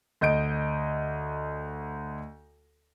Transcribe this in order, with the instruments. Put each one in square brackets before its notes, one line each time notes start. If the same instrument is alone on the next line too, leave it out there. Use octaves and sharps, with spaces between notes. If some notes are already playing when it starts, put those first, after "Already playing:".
[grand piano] D2 D#5 G6 D7